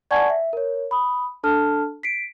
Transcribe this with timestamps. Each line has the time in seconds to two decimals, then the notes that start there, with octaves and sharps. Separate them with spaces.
0.11 D5 F#5 G#5 A5 C#6 G#6
0.30 E5
0.53 A#4 C#5
0.91 B5 D#6
1.43 D4 A4 A5 F6
2.03 B6 C7 D7